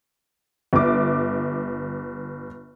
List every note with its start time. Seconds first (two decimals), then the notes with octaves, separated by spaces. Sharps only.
0.73 G1 D6